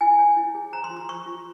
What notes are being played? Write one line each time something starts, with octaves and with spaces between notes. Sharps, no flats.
E4 G#5
C#5
E4
G#4
C5 A#5
C6
F4
C6
C5 C#6
F4